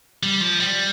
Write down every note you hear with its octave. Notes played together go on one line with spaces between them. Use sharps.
G3
F3
G3